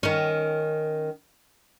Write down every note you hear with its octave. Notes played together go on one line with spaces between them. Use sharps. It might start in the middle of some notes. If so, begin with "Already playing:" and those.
D#3 C#4